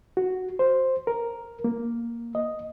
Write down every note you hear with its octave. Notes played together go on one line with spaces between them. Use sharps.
F#4
C5
A#4
A#3
D#5